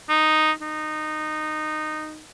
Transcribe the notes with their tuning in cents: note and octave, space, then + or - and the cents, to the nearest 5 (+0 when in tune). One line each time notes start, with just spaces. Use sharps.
D#4 -5
D#4 -15